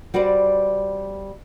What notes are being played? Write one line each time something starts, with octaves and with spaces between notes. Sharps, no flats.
G3 F#4 B4 C5 D5